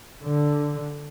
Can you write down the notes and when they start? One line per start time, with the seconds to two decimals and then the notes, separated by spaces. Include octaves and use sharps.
0.24 D3